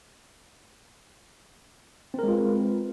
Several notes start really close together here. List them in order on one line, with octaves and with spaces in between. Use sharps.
C4 A#4 G#3 F4 B4